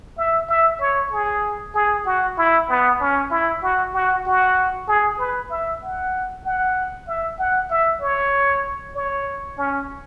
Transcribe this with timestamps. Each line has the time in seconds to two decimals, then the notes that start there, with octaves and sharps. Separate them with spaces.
0.18 E5
0.49 E5
0.80 C#5
1.12 G#4
1.74 G#4
2.06 F#4
2.38 E4
2.69 B3
3.00 C#4
3.31 E4
3.62 F#4
3.94 F#4
4.26 F#4
4.88 G#4
5.19 B4
5.50 E5
5.82 F#5
6.45 F#5
7.07 E5
7.39 F#5
7.70 E5
8.01 C#5
8.95 C#5
9.58 C#4